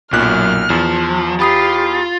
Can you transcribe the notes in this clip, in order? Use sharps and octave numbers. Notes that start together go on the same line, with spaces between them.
B1 F#2 A#2 F6 F#6
E2 F3
F4 G4 B5 D#6 C7